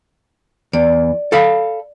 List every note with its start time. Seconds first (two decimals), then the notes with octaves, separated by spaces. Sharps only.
0.73 E2 D5
1.32 A4 F5 B5